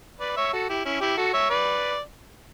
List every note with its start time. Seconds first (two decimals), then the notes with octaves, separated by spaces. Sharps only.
0.20 B4 D5
0.37 C#5 E5
0.53 F#4 A4
0.69 E4 G4
0.85 C#4 E4
1.01 E4 G4
1.17 F#4 A4
1.33 C#5 E5
1.50 B4 D5